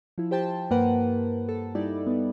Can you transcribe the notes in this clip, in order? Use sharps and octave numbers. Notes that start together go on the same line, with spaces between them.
F3 E4
G4 C5 G5 A5
G2 A#3 A#4 B4 F#5
A4
G3 D#4 E4 D5
G3 B3